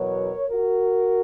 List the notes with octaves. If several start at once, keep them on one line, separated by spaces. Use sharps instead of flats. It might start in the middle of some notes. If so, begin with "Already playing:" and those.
Already playing: E2 B2 F#3 A#4 C#5
F#4 A#4